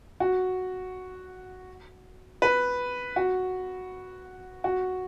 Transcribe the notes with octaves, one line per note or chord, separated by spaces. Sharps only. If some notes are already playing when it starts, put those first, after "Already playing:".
F#4
B4
F#4
F#4